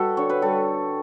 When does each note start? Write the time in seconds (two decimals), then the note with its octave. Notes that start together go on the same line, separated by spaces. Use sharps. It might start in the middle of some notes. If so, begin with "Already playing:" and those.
Already playing: G3 F#4 A4 B4
0.17 D3 C#5
0.30 B4
0.42 G3 A4